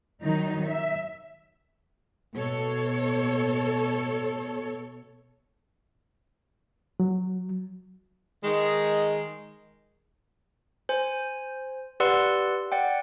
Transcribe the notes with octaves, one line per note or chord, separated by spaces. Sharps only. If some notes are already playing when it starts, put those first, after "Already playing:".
D#3 F#3 D#4
E5
B2 A4 C#5
F#3
D#3 G#3
C5 G#5
G4 B4 D5 F#5 C6 E6
D5 F#5 G5